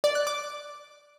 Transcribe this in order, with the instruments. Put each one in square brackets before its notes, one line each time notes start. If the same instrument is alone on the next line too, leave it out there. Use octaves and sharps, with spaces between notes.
[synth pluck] D5
F#6
D6